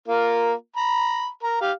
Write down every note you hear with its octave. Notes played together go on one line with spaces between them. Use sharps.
A#3 F4 A#4
A#5 B5
A#4 A#5
G4 F5